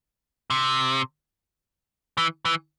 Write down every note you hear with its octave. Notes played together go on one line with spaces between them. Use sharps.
C3
E3
E3